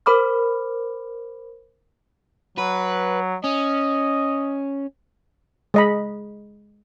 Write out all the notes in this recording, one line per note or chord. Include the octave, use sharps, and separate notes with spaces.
A#4 C5 B5 D6 F6
F#3 B4
C#4 D#5
G#3 D#5 B5